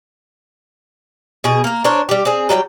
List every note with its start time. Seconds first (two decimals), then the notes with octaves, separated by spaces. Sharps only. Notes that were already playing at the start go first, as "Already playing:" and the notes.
1.44 B2 G#4
1.64 A#3 A#4
1.84 D4 A#4 C5 C#5
2.09 G3 G4
2.25 C4 G#4
2.49 F#3 G3 D#5 G5